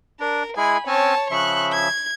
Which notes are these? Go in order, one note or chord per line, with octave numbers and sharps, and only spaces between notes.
D4 A#4
G#3 E4 G#4 G#5 B5
C4 C#4 C#5 G#5 A5
C#3 F3 E5 C#6 F#6
G#6